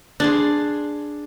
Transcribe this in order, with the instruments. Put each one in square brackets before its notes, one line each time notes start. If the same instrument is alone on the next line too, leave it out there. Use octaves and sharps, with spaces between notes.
[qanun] D4 G#4 C6